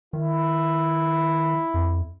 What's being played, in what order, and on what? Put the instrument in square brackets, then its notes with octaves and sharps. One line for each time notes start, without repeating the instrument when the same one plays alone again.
[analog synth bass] D#3 [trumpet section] E4
[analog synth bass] F2